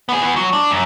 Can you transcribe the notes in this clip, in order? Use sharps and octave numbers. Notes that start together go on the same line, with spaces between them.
B3 G#4
E3 B3
F#3
D4
F#2